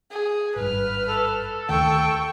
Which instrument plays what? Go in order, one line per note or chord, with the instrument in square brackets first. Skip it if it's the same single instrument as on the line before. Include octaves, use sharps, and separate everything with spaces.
[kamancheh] G#4
[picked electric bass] G#1 G2 [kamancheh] B4 F6
[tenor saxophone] A4
[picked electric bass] D2 D#3 A3 [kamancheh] G5 C#6